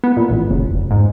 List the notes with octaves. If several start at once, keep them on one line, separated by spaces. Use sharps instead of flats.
B3
A#2
A1
F#1
F1
G#2